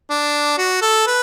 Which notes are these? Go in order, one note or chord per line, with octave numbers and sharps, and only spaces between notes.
D4
F#4
A4
B4